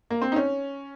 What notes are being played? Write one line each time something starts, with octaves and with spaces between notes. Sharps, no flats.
A#3
C4
D#4
C#4